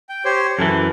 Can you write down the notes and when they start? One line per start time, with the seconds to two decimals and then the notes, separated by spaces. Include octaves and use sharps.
0.09 G5
0.25 G4 C5 C#5
0.59 F#2 E3 A4